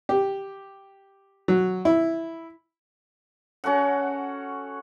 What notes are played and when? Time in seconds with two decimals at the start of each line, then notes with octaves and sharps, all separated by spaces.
0.09 G4
1.48 F#3
1.85 E4
3.64 C#4 F#4 A4 F#5